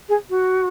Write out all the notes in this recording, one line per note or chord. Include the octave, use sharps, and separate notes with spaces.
G#4
F#4